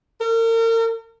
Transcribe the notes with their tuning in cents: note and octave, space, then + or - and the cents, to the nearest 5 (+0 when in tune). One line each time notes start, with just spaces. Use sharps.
A#4 -40